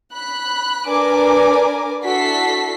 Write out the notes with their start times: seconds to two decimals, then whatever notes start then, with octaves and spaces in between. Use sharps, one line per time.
0.13 B5 F#6
0.88 D4 A#4 B4 D5 G#5 D6
2.05 D4 E4 F#4 A4 B6 C7